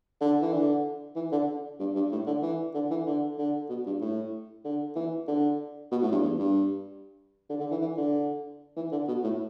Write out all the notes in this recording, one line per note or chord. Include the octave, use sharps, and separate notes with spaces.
D3
E3
D3
E3
D3
G2
G2
A2
D3
E3
D3
E3
D3
D3
B2
G2
A2
D3
E3
D3
B2
A2
G2
E2
G2
D3
D3
E3
E3
D3
E3
D3
B2
A2